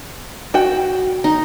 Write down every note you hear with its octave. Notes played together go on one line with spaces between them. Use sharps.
F#4 G5
D#4